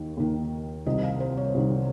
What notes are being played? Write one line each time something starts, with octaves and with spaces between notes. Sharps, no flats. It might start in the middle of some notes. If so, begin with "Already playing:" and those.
Already playing: D#2 D#3
D#2 D#3
C2 C3 D#3 D#5
F5
C5
C#5
C2 C3 D#3